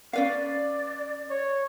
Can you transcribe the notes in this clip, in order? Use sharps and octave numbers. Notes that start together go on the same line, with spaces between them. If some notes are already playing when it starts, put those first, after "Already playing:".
C#4 B4 D5 F5
C#5